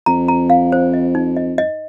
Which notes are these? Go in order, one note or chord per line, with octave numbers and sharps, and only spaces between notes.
F2 A#5
A#5
F5
C5
D#5
D#4
D#5
D#5